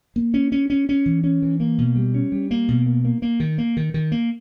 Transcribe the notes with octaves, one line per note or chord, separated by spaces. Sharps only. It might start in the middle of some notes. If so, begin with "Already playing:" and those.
A#3
C#4
C#4
C#4
C#4
E3
C#4
E3
A#3
B2
G3
C#4
G3
A#3
B2
A#3
A#3
A#3
D#3
A#3
D#3
D#3
A#3